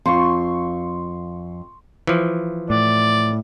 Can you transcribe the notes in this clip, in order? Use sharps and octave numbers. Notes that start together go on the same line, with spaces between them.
F2 C6 C#6
E3 F3
A2 D5